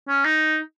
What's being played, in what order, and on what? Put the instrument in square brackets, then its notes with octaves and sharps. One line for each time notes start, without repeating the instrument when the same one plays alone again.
[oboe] C#4
D#4